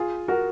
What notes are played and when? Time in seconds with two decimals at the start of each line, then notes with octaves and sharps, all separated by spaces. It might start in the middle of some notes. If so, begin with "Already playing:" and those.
Already playing: F4 G#4
0.28 F#4 A#4